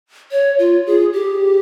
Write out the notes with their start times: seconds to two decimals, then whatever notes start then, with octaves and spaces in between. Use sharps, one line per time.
0.31 C#5
0.59 F4
0.86 G#4
1.13 G4